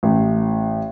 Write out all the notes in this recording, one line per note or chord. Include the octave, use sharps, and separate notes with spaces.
A1